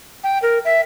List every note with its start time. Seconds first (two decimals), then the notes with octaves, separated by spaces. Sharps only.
0.24 G5
0.42 A#4
0.65 E5